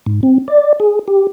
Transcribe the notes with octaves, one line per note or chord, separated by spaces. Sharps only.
G#2
C4
D5
G#4
G4